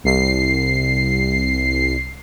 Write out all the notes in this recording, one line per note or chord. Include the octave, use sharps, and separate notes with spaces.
C2 C7